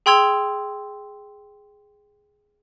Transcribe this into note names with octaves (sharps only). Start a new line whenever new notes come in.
G#4 G5 C6 E6 G#6 F7